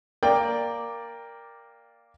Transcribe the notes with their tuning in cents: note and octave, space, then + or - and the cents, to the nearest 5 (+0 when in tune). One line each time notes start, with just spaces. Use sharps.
A#3 +0 D5 +0 G5 +20